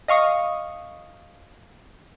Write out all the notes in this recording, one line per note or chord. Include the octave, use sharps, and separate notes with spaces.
D#5 F5 C#6 D#6